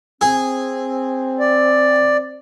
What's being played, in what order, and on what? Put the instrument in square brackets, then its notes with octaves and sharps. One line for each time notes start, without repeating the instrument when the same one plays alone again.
[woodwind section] C4 [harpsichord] G#4
[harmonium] D5